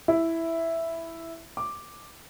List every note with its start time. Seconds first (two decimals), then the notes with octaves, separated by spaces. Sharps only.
0.08 E4
1.57 D6